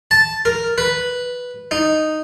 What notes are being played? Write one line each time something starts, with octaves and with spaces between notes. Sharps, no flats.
A5
A#4
B4
D#4